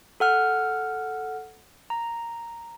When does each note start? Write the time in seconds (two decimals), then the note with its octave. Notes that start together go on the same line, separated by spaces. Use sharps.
0.20 A4 F#5 F6
1.90 A#5